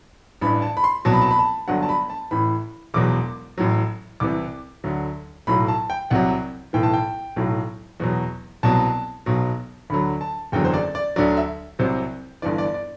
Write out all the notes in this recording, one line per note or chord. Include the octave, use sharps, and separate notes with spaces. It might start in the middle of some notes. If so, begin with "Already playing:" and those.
A1 G2 E3 B5
A5
B5
C6
C2 B2 F#3 A5
B5
A5
B5
A5
G1 G2 F#3 F#5
A5
B5
A5
A1 A2 E3 B5
E1 E2 B2 F#3 D6
A1 A2 F#3
C2 C3 E3 D6
D2 D3 F#3
B1 A2 F#3 B5
A5
G5
C2 C3 F#3 F#5
B1 A2 E3 G5
A5
G5
B1 A2 F#3
E2 B2 F#3
C2 B2 F#3 A5
B1 B2 F#3
D2 D3 F#3 B5
A5
F#1 E2 D3 F#3 G5
C5
D5
D5
D2 D3 F#3 D5
E5
C2 C3 F#3 C5
G1 G2 E3 D5
D5
D5